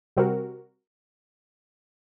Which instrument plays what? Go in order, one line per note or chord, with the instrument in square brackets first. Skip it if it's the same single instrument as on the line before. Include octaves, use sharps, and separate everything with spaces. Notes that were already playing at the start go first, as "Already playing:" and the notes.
[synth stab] C3 G3 C4 F#4 A#4